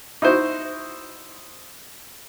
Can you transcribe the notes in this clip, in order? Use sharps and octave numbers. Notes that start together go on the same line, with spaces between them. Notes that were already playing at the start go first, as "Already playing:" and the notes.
D#4 E4 F#4 C5